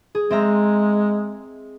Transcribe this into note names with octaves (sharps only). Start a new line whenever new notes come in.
G#4
G#3 C4 E5 A#5